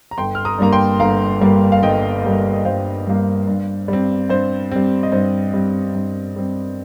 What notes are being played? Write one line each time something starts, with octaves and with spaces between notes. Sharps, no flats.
A#5
G1 G5 C6
F6
A#5 D#6
G2 G3 A#3 A#5
G5 C6
G1 F5 A#5
G2 G3 A#3
F5
G1 D#5 G5
G2 G3 A#3
D#5
G1 C5 F5
G2 G3 A#3
G2
G3 C4
G2 C5
G3 C4
D#5
G2 C5
G3 C4
G2
G3 C4